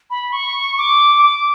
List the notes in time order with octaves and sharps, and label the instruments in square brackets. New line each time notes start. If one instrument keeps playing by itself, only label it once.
[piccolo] B5
C#6
D6
D6